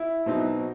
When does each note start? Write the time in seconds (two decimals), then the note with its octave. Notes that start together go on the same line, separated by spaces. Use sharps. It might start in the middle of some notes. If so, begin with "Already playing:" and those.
Already playing: E4
0.26 B2 F#3 C4 D#4